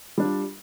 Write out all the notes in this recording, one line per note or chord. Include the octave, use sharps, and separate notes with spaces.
G3 D4 F4